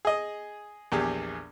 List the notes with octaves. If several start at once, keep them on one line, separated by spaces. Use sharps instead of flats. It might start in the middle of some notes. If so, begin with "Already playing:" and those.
G#4 D#5
A#1 E2 G4 G#4